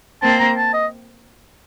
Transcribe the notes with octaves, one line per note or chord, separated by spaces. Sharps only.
A#3 C4 A5
A#5
A5
D#5